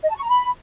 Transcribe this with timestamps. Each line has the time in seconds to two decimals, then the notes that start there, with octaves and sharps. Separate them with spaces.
0.03 D#5
0.09 A5
0.16 C#6
0.22 A#5
0.29 B5